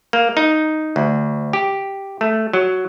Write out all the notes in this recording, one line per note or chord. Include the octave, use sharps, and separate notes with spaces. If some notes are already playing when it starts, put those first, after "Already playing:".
A#3
D#4
D2
G4
A3
F#3